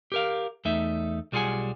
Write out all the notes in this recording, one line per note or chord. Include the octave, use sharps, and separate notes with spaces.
G4 A#4 F5
E2 A3 D#4 E5
B1 G3 F4 G#4 F#5 G#5